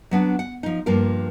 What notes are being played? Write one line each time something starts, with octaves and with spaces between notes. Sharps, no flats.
F#3 B3 D4
F#5
F3 D#4
G2 F3 A#3 A#4